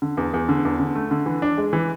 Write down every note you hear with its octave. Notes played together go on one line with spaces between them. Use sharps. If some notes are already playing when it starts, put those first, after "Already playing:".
D3
E2
E2
D3
E2
D3
A3
D3
E3
D4
G#3
E3